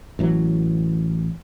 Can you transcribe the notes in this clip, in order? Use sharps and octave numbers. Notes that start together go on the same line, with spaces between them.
A1 E3 F#3